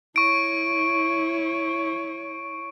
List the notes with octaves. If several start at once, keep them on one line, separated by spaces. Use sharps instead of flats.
E4 C#5 C#6 D7